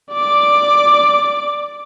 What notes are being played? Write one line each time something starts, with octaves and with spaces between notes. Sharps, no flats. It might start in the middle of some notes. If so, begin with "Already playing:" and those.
D5 D6